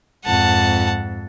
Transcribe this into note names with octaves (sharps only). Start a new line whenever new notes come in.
F2 G#2 F#5 A5